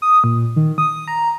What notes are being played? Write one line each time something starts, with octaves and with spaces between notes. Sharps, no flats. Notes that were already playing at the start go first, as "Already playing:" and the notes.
D#6
A#2
D#3
D#6
A#5